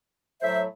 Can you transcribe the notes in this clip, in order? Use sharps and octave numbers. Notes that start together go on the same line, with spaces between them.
A2 F#3 C5 E5